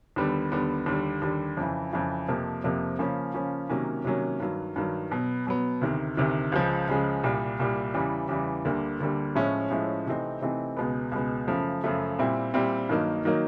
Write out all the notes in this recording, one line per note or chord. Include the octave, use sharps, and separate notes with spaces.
D#2 D3 G3 B3
D#2 D3 G3 B3
D#2 D3 G3
D#2 D3 G3
F2 C#3 E3
F2 C#3 E3
F2 C3 F3 A#3
F2 C3 F3 A#3
C#3 F3 A#3 C#4
C#3 F3 A#3 C#4
C3 D#3 F#3 A#3 C#4
C3 D#3 F#3 A#3 C#4
G2 D#3 F#3
G2 D#3 F#3
B2 F#3 B3
B2 F#3 B3
D2 C3 D#3
D2 C3 D#3
C#2 C#3 F3 G#3
C#2 C#3 F3 G#3
C2 A#2 G3
C2 A#2 G3
E2 C#3 E3 G3
E2 C#3 E3 G3
D2 D3 G3 A#3
D2 D3 G3 A#3
A2 F3 G#3 C#4 E4
A2 F3 G#3 C#4 E4
C3 E3 A3 C4 D#4
C3 E3 A3 C4 D#4
C#2 B2 G#3 B3
C#2 B2 G#3 B3
F#2 C#3 F3 A3
F#2 C#3 F3 A3
A#2 G3 C4 E4
A#2 G3 C4 E4
G2 D#3 F#3 A#3 D#4
D#3 F#3 A#3 D#4